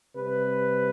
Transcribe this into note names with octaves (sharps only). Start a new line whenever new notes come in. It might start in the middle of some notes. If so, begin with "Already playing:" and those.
C3 G3 B4